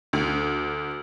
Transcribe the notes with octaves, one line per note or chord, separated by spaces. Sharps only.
D2